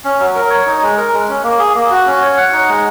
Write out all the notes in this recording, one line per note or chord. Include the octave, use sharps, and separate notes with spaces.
C#4
F#3
A#4
C#5
D#4
G#3
A#4
G#3
C#4
A#3
G#4
A#3
F#4
C#4
C#5
F#5
D#4
G#3